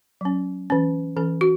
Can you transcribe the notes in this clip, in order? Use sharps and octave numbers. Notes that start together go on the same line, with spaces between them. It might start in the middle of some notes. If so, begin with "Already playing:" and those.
F#3 C#4
E3 C#4
E3 C#4 A4
F#4